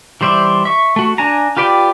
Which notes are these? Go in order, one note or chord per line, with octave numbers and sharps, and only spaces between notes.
E3 G3 C5 D5 E5
E5 C#6
A3 F#4
D4 G#5 A#5
F4 G4 B4 D5 G5